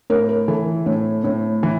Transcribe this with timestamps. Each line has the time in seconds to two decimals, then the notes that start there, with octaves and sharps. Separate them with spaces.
0.10 A2 A#4
0.29 A#4
0.48 E3 A4
0.86 A2
1.24 A2
1.63 E3